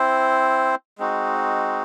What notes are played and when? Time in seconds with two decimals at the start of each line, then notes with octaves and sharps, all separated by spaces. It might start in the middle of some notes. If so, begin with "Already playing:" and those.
Already playing: C4 E4 C5
0.98 G#3 C4 D#4 F#4